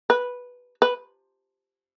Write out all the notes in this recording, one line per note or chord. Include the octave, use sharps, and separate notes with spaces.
B4
B4